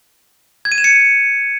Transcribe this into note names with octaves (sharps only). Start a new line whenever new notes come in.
G#6
D#7
E7
C#7